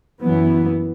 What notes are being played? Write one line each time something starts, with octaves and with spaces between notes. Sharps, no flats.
F#2 E3 B3